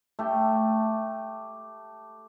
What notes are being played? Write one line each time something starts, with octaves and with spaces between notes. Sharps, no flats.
A3 G4